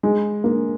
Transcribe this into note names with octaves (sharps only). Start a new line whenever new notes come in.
G#3
A#3